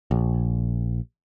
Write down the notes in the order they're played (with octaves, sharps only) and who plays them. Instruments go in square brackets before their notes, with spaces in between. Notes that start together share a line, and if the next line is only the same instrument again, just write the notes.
[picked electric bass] A#1